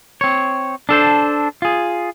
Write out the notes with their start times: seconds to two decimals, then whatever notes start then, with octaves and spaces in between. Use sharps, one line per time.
0.21 C4 C#5
0.89 D4 A4 C5
1.62 F4 G#4